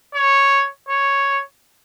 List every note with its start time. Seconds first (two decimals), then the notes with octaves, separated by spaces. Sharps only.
0.15 C#5
0.89 C#5